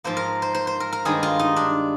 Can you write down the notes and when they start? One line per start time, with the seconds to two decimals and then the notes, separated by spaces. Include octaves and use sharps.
0.04 G#2 F3 A#3 C5
0.17 A#4
0.42 C5
0.55 C5
0.67 C5
0.80 A#4
0.92 A#4
1.05 G2 D#3 G#3 G#4
1.23 F4
1.39 D#4
1.56 D4